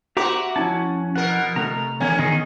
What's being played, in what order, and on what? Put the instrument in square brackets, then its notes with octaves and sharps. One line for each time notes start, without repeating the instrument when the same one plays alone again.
[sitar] F#4 [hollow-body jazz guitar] G4 C5 [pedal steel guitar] E5 A#5 D6
[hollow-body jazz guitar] F2 E4 A5 [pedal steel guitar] C#4
[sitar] B2 A#4 [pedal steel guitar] F#5
[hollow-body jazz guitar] C3 A3 [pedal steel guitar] A#5
[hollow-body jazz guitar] E2 F#5 G#5 [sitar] D3 C#4
[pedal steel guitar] D#3 D#4 G#4